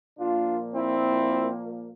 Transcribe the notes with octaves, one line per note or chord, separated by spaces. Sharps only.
A#2 F3 A#3 D4 F4
C4 E4